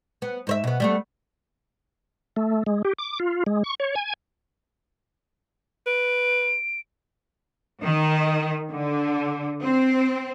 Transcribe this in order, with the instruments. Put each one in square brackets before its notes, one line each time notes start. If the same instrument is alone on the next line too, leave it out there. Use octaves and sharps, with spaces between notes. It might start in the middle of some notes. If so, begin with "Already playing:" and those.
[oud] B3
G#2 C5 E5
B2 B3
G3 A3 B3
[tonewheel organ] A3
G#3
G4
D6
F4
G#3
C#6
C#5
G#5
[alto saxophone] B4 [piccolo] D7
[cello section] D#3
D3
C4